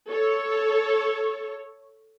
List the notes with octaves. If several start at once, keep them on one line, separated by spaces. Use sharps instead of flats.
A4 C#5